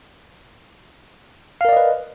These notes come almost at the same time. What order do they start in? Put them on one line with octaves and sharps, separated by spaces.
F5 A#4 D5 D#5 B4